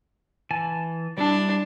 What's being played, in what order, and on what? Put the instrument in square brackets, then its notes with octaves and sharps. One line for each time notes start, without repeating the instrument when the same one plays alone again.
[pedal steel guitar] E3 G#5 A5
[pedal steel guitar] G3 E4 [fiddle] D4